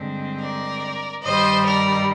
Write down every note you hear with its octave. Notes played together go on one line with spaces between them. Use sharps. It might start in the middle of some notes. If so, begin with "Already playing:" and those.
Already playing: G2 D3 G#3 C4
A#4 D5
G2 D#3 G3 C5 D#5
A#4 D5